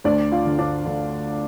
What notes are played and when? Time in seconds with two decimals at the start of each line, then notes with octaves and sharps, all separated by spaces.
0.04 D2 D4 D5
0.31 F4 F5
0.45 D3
0.59 D4 D5
0.86 D3